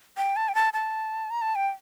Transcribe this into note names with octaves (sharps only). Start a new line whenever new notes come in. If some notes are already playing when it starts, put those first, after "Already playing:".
G5
A5
G5
A5
A5
A#5
A5
G5